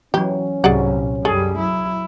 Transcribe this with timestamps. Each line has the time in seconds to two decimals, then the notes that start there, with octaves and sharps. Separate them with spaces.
0.14 E3 F#3 C#4 G4
0.64 C2 G#2 F#3 G#4 D5 F#5
0.94 A#2
1.25 F#2 G3 G#4 A4
1.59 F#3 E4